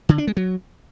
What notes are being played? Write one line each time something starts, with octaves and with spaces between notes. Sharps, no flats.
D3
D4
G#3
F#3